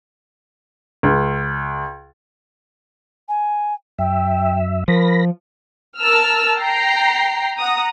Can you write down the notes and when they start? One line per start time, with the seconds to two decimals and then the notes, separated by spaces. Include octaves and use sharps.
1.03 C#2
3.28 G#5
3.99 F#2 E5 G5
4.88 F3 A#4 B5 A#6
5.98 A#4 A5 E6 F6
6.58 G5 A#5 C7
7.58 F#5 A#5 D#6